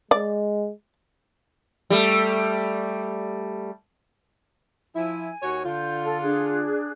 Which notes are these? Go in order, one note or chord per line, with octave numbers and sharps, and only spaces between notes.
G#3 D5
G3 A3
F3 E4 G#5
D#2 F#4 C#5
D3 F4 G6
A4
D4 G#4 F#6